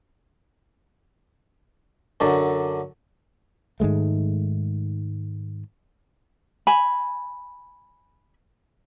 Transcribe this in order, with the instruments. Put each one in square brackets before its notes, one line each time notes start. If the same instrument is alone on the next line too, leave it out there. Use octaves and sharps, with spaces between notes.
[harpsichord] F#2 D3 F#3 D4
[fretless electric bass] G#2 D#3 G#3 A3
[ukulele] G#5 B5